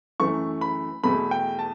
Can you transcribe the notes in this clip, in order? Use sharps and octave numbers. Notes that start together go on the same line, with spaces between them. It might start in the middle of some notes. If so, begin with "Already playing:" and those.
F#2 E3 A3 C#6
B5
E2 B2 A3 B5
G5
A5